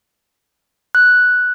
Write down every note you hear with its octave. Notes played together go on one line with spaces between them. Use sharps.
F#6